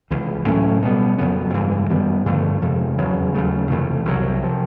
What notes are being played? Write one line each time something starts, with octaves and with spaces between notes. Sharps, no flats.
C#2 C3 E3
A2 F#3 A3 C#4
B2 G3 B3
F2 C#3 F#3 B3
G2 E3 G#3
F#2 D#3 G3 B3
G2 D3 F3 A3
F2 C3 F3 G#3
E2 C#3 F#3
D#2 C#3 F#3 A3
F2 C3 E3 A3
C2 C3 D#3 F#3
C3 F3